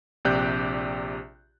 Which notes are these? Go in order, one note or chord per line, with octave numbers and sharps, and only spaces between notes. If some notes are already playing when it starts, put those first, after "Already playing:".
A#1 C3 G4 D5 F#6 G6